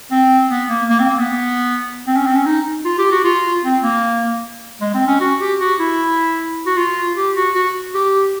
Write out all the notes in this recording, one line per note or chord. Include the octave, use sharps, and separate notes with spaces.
C4
B3
A#3
A#3
C4
A#3
B3
C4
C#4
C4
C#4
D#4
F4
G4
F#4
F4
C4
A#3
G#3
C4
C#4
F#4
G4
F#4
E4
F#4
F4
G4
F#4
F#4
G4